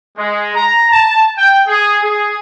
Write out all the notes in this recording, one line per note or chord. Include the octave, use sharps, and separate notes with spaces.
G#3
A#5
A5
G5
G#4
G#4